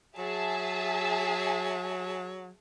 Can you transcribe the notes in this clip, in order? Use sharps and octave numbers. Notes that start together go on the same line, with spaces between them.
F#3 G#4 E5 A5